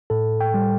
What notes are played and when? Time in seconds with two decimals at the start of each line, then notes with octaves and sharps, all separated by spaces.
0.10 A2 A4
0.41 G5
0.54 G3